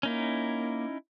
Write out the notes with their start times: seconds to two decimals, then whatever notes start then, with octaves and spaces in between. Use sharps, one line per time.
0.03 A#3 C#4 D#4 E4